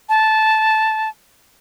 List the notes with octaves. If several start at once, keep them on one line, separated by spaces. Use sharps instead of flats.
A5